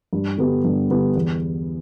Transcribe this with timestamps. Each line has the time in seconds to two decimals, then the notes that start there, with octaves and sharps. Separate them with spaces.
0.13 G2
0.38 D3 G3 B3
0.64 G2
0.90 D3 G3 B3
1.15 E2